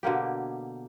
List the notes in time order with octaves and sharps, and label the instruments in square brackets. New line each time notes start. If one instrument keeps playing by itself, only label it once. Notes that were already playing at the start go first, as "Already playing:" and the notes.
[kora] B2 D3 A#3 G4